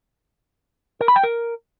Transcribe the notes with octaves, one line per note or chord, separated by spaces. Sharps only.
A#4
B5
G5
A#4